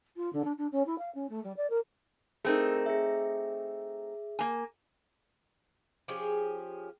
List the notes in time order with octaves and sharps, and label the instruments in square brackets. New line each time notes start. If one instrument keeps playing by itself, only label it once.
[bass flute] F4
D3
D4
D4
C#4
E4
F5
C#4
A3
G3
D5
A#4
[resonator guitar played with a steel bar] A3 C4 D#4 [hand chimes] G#4 A#4
[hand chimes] G#4 E5
[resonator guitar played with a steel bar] A#3 G#5
[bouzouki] F3 C#4 G4 G#4